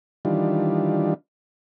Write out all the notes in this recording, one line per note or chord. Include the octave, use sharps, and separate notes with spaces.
D#3 E3 G3 D4 F4